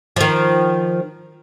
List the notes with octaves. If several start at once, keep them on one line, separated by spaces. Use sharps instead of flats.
D#3 F3